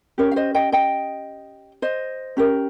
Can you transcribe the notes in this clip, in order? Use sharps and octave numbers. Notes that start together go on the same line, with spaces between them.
C#4 G4 A#4 C#5
F5
C5 D#5
D#5 G5
D#5 G5
C5 D#5
C#4 G4 A#4